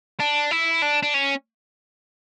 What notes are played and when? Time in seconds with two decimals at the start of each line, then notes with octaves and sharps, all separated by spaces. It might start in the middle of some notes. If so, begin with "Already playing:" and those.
0.20 D4
0.51 E4
0.82 D4
1.03 D4
1.14 C#4